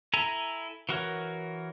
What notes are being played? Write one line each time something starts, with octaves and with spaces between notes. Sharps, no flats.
E4 A4 G#5 A#5
E3 F#4 A#4 C#5